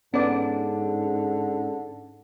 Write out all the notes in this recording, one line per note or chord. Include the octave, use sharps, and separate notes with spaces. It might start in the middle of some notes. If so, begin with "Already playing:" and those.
G#2 D3 B3 C#4 D5